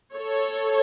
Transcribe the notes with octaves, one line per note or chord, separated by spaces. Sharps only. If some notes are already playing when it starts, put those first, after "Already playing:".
A4 C#5